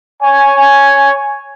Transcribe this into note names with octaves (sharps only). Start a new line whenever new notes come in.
C#5 G#5